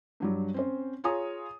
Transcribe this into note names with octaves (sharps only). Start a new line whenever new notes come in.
G2 F#3 G3
C4 C#4 C5
F4 G#4 C#5 G#5 A#5 D#6